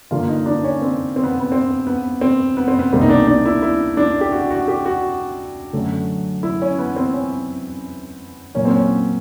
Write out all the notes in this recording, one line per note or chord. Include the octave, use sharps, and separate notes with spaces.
G2 D3 G3 A#3 F4
D#4
D4
C#4
C4
C4
B3
B3
C4
B3
C4
B3
C4
B3
C2 B2 G3 A#3 C4
D#4
D4
D4
E4
E4
D4
G4
F#4
F#4
G4
F#4
F#2 D3 F#3 A3
E4
C#4
B3
C4
C#4
A#2 F#3 A#3 C#4
C4
C#4